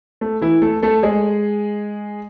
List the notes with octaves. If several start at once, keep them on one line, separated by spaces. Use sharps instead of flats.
A3
E3 E4
A3 A4
A3 A4
G#3 G#4